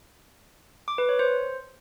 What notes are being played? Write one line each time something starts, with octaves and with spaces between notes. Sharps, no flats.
D6
B4
C#5
C5